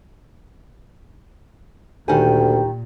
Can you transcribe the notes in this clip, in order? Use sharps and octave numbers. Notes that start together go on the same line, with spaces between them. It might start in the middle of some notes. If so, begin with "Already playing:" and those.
D2 G2 A#2 D#3 G4 G5 G#5